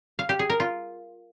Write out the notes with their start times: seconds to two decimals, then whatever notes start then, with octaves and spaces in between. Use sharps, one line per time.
0.19 F5
0.29 G4
0.39 G#4
0.50 A#4
0.60 F4